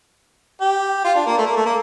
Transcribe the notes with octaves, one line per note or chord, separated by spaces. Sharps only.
G4
F4
D4
A#3
A3
A#3
A3
A#3